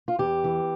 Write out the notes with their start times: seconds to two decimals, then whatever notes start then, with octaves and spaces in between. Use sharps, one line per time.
0.08 F4
0.19 E2 G4
0.44 E3